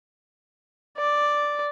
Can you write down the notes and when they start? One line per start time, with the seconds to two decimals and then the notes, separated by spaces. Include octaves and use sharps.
0.97 D5